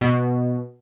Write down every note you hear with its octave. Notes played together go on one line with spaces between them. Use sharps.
B2